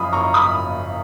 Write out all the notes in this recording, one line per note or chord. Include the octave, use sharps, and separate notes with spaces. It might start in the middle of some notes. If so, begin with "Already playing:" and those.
Already playing: F#1 F#2 C#3 F3 F5 B5 D#6
A#5 C#6
B5 D#6